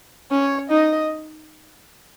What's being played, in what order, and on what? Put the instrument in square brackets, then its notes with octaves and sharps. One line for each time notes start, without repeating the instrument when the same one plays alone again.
[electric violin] C#4 [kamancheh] C#5
[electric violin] D#4 [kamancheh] D#5